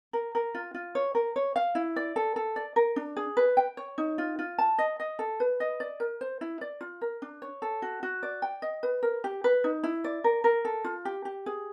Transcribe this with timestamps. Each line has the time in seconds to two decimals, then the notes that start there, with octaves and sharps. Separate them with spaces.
0.13 A#4
0.35 A#4
0.54 F4
0.74 F4
0.95 C#5
1.15 A#4
1.36 C#5
1.56 F5
1.75 E4
1.96 D5
2.16 A4
2.36 A4
2.56 D5
2.76 A#4
2.96 D4
3.17 G#4
3.37 B4
3.57 G5
3.77 C#5
3.98 D#4
4.18 F4
4.39 F4
4.58 A5
4.78 D#5
5.00 D#5
5.19 A4
5.40 B4
5.60 D#5
5.80 D5
6.00 A#4
6.21 C5
6.41 E4
6.61 D5
6.81 F4
7.01 A#4
7.22 D4
7.42 C#5
7.62 A4
7.82 F#4
8.03 F#4
8.23 D5
8.42 G5
8.62 D#5
8.83 B4
9.03 A#4
9.24 G4
9.44 B4
9.64 D#4
9.83 E4
10.04 D5
10.24 A#4
10.44 A#4
10.65 A4
10.84 F4
11.05 G4
11.25 G4
11.46 G#4